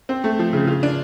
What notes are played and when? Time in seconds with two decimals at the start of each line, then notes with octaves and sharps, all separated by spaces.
0.09 C4
0.24 A3
0.39 F3
0.53 C#3
0.67 F4
0.83 D4